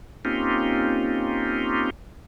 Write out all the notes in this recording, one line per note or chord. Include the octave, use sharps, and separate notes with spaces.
A#3 C4 C#4 D#4 F4 G4